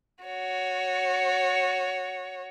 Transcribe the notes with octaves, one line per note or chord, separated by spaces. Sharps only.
F#4 C#5